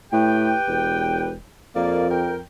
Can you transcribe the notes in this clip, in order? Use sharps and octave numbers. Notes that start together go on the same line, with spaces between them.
A2 G4 B4 G5
E1
F2 A#3 D5
A#4 G5